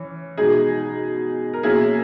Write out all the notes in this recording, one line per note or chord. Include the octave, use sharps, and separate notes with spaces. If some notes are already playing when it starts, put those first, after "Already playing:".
Already playing: E3 C#4
B2 G#3 D#4 G#4
A#4
B2 A#3 C#4 E4 G#4